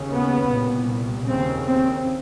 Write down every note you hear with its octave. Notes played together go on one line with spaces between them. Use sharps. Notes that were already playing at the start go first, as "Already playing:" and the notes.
Already playing: D#2 C#3
B3
C2 A#2
D#2 C#3 C4
C4